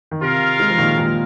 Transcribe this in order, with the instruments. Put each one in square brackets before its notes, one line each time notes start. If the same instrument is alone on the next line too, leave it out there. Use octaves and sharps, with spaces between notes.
[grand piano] D#3
[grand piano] C3 [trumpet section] F4 A#4 F5
[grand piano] G#3
F3
A#2 D#3
D#3 G#3